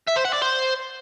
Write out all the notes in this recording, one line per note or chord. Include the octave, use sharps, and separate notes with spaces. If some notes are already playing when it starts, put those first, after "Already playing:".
E5
C5
F#5
D5
C5